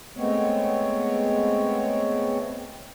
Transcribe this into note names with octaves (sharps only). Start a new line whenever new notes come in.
G#3 A3 B3 C4 C#5